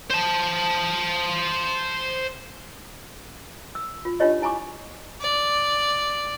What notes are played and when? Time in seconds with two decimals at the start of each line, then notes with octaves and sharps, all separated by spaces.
0.11 C5 A5
3.75 E6
4.05 F4
4.20 D4 D#4 F4 G4 C#5 D#5
4.42 E4 G#5 A#5 C#6 D6
5.21 D5